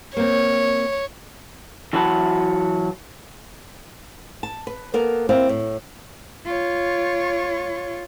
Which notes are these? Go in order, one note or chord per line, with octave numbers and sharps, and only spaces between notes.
A#3 C4 C#5
E3 F#3 F#4 B4 A5
A5
B4
A#3 B3 A4 A#4
A#3 C4 E4 C5 F5
A2
F4 C#5